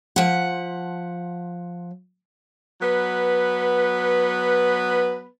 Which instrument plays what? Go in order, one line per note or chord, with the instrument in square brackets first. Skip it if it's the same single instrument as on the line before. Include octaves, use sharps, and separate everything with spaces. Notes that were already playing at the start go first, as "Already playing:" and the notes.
[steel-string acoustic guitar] F3 F#5
[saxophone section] F#3 B3 B4